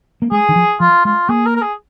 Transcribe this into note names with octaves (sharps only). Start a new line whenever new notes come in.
A#3
G#3 G#4
D#3
F3
F3 F4
G#3 F4
A#3 G#4
A#4
A#4
G#4